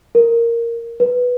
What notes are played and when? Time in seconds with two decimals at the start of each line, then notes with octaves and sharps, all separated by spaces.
0.15 A#4
1.00 B4